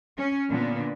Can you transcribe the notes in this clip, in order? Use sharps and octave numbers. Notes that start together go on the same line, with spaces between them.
C#4
A#2 D3 B3